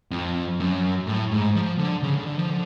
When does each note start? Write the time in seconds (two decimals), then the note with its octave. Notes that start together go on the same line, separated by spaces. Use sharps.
0.11 F2
0.60 F#2
1.07 A2
1.32 G#2
1.55 F3
1.79 D3
2.03 C#3
2.15 D3
2.27 D3
2.39 F3
2.50 D3